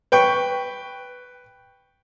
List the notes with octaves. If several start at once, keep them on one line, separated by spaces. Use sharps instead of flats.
B4 G5 C#6